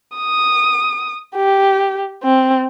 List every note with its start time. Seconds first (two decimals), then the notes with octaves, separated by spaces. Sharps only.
0.17 D#6
1.36 G4
2.24 C4